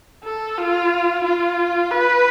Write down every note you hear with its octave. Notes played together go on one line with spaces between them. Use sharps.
A4
F4
F4
B4